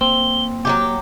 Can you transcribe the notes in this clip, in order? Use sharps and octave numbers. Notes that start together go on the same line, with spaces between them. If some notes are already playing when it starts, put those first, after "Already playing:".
A#3 C4 G7
F#3 G3 G4 D6